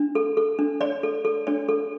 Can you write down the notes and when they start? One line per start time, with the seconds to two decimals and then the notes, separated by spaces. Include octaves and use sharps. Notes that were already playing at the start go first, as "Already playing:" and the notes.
Already playing: D4
0.15 A4
0.37 A4
0.59 D4
0.81 C#5 D5
1.03 A4
1.25 A4
1.47 D4 C#5
1.69 A4